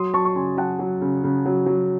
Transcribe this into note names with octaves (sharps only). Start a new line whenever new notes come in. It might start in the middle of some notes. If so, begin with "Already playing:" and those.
Already playing: F#3 C6 D#6
F#3 A5 C#6
C#6
C#3 G#5 C6
F#3 F#5 A5
F#3
C#3
C#3
F#3
F#3